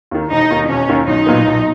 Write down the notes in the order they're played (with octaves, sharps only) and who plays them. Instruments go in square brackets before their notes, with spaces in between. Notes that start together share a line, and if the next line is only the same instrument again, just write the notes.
[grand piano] D#2 D#3
[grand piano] E1 [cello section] D#4
[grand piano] D#2 D#3
[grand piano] E1 [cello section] C#4
[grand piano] D#2 D#3
[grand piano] B1 [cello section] D#4
[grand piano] A#2 F#3 B3
B1